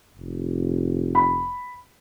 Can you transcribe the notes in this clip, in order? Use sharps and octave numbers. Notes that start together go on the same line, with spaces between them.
F1
B5